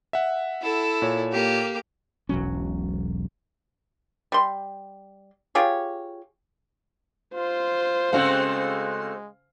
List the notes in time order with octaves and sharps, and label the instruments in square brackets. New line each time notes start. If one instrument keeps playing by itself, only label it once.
[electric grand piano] E5 F#5
[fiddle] E4 A4
[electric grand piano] A#2 C#5
[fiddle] A#3 G4
[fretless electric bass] E1 B1 F#3 C#4
[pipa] G3 C6
F4 G4 G#4 C#5
[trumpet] F4 [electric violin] C5
[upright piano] C#3 F5 [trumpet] G#3 [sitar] A3 C4 F#4